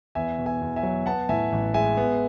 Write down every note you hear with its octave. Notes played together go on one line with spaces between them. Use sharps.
E2 E5 G#5
B2
E5 G#5
E2
E5 G#5
F#3
B3 F#5 A5
A2 E5 G#5
A1
G#3 E5 G#5
B3